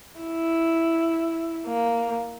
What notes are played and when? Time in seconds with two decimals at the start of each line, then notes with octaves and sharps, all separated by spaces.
0.21 E4
1.67 A#3